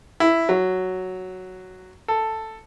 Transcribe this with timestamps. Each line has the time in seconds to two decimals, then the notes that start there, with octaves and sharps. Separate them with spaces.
0.20 E4
0.49 F#3
2.08 A4